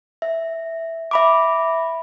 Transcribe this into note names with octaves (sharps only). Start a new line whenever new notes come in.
E5
E5 B5 D6